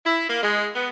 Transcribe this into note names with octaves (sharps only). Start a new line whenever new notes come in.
E4
A#3
G#3
B3